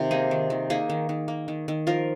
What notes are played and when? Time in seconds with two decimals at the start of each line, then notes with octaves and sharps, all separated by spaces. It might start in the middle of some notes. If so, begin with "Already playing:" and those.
Already playing: C3 D#3 F4
0.11 A#3 D#4 G#4
0.31 D#3
0.50 D#3
0.70 A#3 D#4 G#4
0.90 D#3
1.09 D#3
1.28 A#3
1.48 D#3
1.68 D#3
1.87 F3 F4 A#4